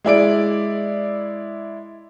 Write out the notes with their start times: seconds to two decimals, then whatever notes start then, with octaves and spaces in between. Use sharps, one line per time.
0.04 G#3 E4 D5 D7